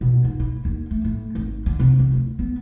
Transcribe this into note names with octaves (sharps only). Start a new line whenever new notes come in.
B2
G#2
E4
D#2
A3
A2
G#1
D3
C3
C4
D2
B3